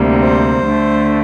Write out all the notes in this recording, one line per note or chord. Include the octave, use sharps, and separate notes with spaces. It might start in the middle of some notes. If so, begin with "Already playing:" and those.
Already playing: D2 C3 G3 A#3
C5
D2 D3 A3